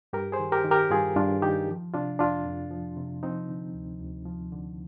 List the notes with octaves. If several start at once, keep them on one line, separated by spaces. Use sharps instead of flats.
G2 G4 A#4
G#4 C5
D#3
G4 A#4
D#3
G4 A#4
G2 F4 G#4
G2 D4 F4
D#3 D#4 G4
F3
C3 D4 F4
F2 D4 F4
F2
F3
C3
F3 C4 D#4
D3
D2
D2
F3
D3